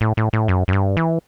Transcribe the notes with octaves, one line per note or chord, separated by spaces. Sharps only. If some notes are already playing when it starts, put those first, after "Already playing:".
A2
A2
A2
F#2
F#2
G2
E3